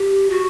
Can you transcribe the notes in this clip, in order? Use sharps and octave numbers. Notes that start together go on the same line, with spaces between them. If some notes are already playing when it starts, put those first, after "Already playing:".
Already playing: G4
F#4